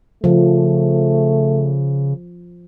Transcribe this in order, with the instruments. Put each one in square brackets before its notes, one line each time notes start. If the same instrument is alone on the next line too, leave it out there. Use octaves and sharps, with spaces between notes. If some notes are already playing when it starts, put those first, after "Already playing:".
[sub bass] C#3 [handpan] F3 [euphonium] A3